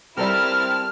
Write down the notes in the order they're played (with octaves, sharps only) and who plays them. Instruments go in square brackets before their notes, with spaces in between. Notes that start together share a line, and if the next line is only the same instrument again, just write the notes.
[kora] G3 A4 A#4 [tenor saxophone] C4 [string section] E4 A5 [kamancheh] F6